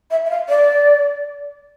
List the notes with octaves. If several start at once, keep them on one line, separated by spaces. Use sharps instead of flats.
E5
E5
F5
D5